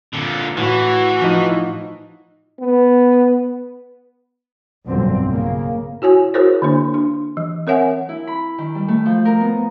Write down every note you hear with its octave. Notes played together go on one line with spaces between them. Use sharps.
A#2 D3
A2 E3 F#4
F3 D#4
B3
B1 G2 A#2 D3 C4
C#3 A#3
E4 F#4 C#5 G#5
E4 F#4 G#4 A#4 C5 C#5
D3 A#3 D4
D4
E3
C4 A#4 C#5 E5 F#5 G#5
E4
B5
D#3
G3
A3
F3
A#4
B3